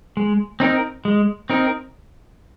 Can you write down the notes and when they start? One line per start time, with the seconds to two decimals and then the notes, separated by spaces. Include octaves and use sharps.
0.17 G#3
0.60 C4 D#4 A#4
1.05 G#3
1.50 C4 D#4 A#4